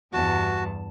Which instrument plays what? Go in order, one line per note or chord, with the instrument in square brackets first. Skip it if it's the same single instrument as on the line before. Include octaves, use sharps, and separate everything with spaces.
[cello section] E2 G2 [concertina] F#4 [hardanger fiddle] A5